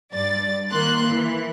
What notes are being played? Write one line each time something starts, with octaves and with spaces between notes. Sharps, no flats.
G2 D5 A6
D#3 A#3 C6 F#6
E3